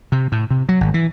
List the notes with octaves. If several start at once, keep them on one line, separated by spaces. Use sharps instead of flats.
C3
A2
C3
F#3
G#1
E3